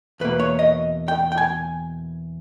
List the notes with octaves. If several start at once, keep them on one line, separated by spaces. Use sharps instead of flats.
E2 B2 A#3 B4
C#5
D#5
G5
G5
G#5